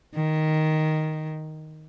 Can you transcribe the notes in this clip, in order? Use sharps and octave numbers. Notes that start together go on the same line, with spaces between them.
D#3